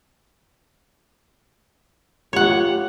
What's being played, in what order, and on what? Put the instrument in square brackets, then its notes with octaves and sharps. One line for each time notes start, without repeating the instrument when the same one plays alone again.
[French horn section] F4 G4 [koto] C#5 F#5